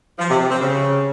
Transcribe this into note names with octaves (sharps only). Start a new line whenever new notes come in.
F3
C3
C3
C4
C#3